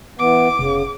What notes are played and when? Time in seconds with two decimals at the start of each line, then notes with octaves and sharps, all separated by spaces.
0.19 E3 B3 D6
0.59 F1 C#3